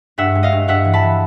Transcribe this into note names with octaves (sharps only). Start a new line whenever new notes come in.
G2 E5 F#5
G#3
D#5 F5
G2
G2 E5 F#5
E3
A5 B5
E3